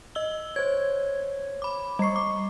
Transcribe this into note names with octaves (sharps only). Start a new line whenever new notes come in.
D#5 E6 G7
C5 C#5 G#6
B5 D6
G3 D#5 C#6 C7
D6